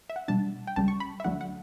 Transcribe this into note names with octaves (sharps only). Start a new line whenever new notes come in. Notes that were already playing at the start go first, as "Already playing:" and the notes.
E5
F#5
B2 G3 D4 A5
G5
C#2 C#3 G3 A5
C#6
B5
E5
D2 D3 F#3 A3 D4 F#5
F#5